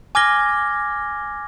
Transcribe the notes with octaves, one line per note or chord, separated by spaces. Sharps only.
G#5 D6 F6 G#6 A#6 G7